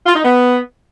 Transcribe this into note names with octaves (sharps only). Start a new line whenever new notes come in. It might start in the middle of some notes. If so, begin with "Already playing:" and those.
F4
D#4
B3